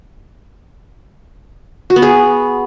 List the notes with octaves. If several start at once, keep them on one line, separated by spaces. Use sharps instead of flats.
F#4
B3
G#4